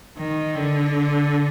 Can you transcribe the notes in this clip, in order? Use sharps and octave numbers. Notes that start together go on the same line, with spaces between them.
D#3
D3